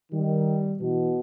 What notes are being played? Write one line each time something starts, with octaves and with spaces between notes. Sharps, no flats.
D#3 G3
B2 E3